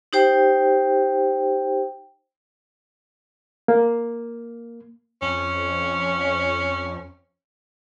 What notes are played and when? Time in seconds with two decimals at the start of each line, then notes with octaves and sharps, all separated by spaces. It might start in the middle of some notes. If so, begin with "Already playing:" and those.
0.13 D#4 G4 C5 G5
3.68 A#3
5.22 F2 C#4